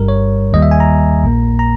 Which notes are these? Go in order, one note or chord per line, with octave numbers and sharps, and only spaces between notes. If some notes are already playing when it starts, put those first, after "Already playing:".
Already playing: G1 G2 G3 A#4
C#5
D#2 D#3 G3 A#3 D#5
E5
G#5
A#5
A#1 A#2 A#3
A#5